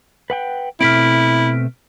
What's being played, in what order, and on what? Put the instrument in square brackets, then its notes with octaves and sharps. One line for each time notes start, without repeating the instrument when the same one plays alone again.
[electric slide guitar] B4 F#5 G5
[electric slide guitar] B2 A3 C4 [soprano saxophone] E4 [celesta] F6 B6 D7